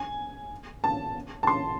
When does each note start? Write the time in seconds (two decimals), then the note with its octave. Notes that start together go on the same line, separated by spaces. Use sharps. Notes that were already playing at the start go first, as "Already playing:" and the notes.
Already playing: G#5
0.84 A5
1.43 A5
1.47 C6